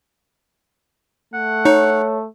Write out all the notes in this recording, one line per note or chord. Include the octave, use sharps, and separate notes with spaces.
A3 F#5
D#4 C#5